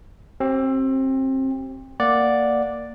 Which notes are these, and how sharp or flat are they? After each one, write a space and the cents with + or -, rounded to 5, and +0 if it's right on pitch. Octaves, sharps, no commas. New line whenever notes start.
C4 +25 G4 -35
A#3 -10 D5 +0 F#5 -10